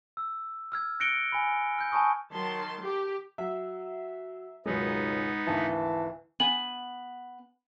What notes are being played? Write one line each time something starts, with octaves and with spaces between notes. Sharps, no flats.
E6
E6 F6 G#6
F#6 A#6 C#7 D7 G7
G#5 B5
F6 G6
G#5 A5 B5 C#6 D#6
D#3 F#3 A5 C6
G4
F#3 E5
C#2 F#2 B2 D#3 G#3 B3 D#4
G#1 D2 E3 A5
B3 G#5 F#7